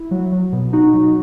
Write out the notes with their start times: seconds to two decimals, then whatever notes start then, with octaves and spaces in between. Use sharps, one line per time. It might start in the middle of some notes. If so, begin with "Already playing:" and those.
Already playing: E4
0.11 F#3
0.32 F#3
0.53 B2
0.73 B2 D#4 F#4
0.94 F#3